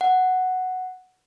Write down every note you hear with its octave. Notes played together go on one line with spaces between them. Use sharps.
F#5